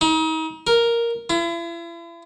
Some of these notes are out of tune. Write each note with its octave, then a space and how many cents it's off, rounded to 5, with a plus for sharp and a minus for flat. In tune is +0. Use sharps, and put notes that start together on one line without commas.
D#4 +40
A#4 +0
E4 +40